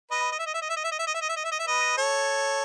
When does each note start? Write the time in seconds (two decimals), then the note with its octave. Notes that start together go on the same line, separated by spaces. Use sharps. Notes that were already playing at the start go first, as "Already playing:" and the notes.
0.11 B4 D#5
0.32 D#5
0.39 E5
0.47 D#5
0.54 E5
0.62 D#5
0.70 E5
0.77 D#5
0.84 E5
0.92 D#5
0.99 E5
1.07 D#5
1.14 E5
1.22 D#5
1.29 E5
1.37 D#5
1.45 E5
1.52 D#5
1.59 E5
1.67 B4 D#5
1.98 A4 C#5